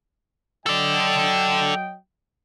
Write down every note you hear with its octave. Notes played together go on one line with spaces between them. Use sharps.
F#3 A4 D5 D#5 G5